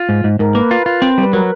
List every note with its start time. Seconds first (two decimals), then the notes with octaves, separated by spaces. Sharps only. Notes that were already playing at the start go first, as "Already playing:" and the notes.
Already playing: F4
0.09 G#2
0.24 G#2
0.39 G#2 A#4
0.55 A#3 B4
0.71 F4 B4
0.86 F4
1.02 C4
1.18 G3
1.23 B4
1.33 F#3 A#4